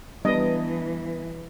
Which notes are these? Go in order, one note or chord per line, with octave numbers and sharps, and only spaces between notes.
E3 G3 B3 D4 B4 D#5